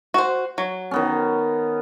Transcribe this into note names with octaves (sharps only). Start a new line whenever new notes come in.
F#4 C5
F#3
D#3 B3 C#4